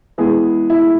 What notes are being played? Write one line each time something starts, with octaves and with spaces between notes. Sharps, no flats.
E3 G#3 B3 G#4
E4